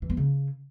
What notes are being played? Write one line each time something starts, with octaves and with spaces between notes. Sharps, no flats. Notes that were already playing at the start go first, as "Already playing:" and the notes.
E3
B3
C#3